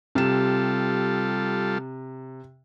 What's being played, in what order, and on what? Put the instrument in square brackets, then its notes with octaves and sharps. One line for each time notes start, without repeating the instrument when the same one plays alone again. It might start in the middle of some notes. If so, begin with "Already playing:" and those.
[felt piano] C3 E7 [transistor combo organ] G3 F4 A4